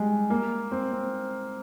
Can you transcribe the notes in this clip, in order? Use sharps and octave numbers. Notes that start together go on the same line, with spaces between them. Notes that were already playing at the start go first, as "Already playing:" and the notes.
Already playing: G3 G#3
A#3
C4
C4